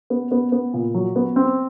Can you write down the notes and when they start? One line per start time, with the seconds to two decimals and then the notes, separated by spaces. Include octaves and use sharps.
0.10 B3
0.31 B3
0.52 B3
0.73 A#2
0.94 F#3
1.16 B3
1.36 C4